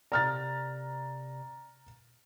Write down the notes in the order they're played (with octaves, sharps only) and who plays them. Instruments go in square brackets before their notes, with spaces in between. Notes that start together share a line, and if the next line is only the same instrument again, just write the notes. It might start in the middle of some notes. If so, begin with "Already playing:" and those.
[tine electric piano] C3 D5 [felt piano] A#5 F6 A6